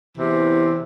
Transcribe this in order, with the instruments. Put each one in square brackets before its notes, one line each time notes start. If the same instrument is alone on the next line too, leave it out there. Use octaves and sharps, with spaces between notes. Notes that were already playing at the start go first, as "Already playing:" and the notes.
[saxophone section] E2 C3 E3